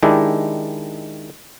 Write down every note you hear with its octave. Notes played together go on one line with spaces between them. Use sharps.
D#3 G#3 D4 E4 G4